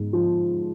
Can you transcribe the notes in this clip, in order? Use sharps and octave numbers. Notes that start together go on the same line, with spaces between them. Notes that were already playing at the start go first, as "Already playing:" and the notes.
Already playing: G#2 G#3
F3